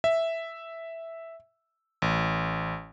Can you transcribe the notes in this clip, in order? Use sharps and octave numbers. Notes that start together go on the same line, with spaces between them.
E5
A1